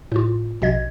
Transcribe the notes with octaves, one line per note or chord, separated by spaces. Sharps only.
A2 F4
A#1 B2 D#5 G#6